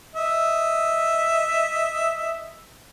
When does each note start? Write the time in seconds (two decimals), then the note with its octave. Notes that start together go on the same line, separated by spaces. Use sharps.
0.15 D#5 E5